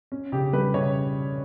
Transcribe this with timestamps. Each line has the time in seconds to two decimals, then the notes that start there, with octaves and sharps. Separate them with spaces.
0.12 C#4
0.32 C#3 G4
0.53 G3 B4
0.74 C#3 C#5